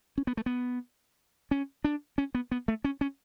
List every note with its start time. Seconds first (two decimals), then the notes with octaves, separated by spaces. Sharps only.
0.18 C#4
0.27 B3
0.37 A3
0.46 B3
1.51 C#4
1.84 D4
2.18 C#4
2.35 B3
2.51 B3
2.68 A3
2.84 C#4
3.01 C#4